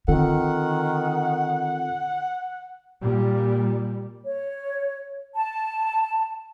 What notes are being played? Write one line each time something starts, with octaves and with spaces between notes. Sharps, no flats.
D3 D#3 C4 F4 A4 F#5
A#2 G3
C#5
A5